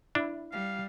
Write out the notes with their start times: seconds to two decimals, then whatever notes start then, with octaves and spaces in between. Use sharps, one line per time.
0.15 D4 E4
0.52 G3 F5